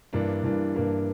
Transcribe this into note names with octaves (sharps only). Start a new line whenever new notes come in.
G2 E3 A#3 D4
G2 E3 A#3 D4
G2 E3 A#3 D4